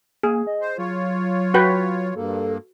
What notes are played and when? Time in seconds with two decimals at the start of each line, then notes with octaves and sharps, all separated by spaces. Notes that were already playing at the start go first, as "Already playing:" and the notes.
0.23 A#3 G#4
0.47 D#5
0.61 C5
0.78 F#3 F4 C#5
1.54 F#4 B4 G5
2.16 G2 A#3 A4